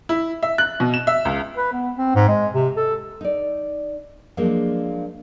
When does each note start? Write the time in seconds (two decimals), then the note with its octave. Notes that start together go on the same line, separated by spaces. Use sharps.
0.09 E4
0.43 E5
0.58 F#6
0.80 B2
0.94 E7
1.07 E5
1.25 C#2
1.57 B4
1.73 B3
1.97 C4
2.15 G#2
2.28 G#3
2.53 C3
2.77 A4
3.21 D#4 D5
4.37 F3 F#3 G#3 A#3 D4